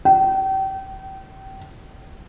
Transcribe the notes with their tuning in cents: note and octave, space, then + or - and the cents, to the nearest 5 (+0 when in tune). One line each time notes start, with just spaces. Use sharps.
G5 -30